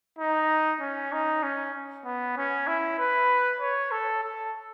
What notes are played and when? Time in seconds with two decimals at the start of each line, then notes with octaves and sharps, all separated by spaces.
0.19 D#4
0.81 C#4
1.12 D#4
1.43 C#4
2.05 B3
2.37 C#4
2.67 E4
2.99 B4
3.61 C#5
3.91 A4
4.23 A4